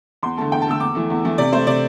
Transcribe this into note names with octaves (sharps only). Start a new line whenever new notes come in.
E2 C6
D3 A3 A5
E2 G5
A5
D3 A3 E6
E2 D6
E3 A3
E2
E3 A3
C3 D5
A3 C5
C3 D5